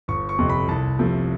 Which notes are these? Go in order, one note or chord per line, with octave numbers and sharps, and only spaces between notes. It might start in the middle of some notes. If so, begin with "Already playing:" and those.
G1 C#6
C#6
F2 C3
B5
C2 A5
C3 F3 A3